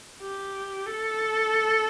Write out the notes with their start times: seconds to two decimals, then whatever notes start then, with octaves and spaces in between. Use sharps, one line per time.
0.20 G4
0.87 A4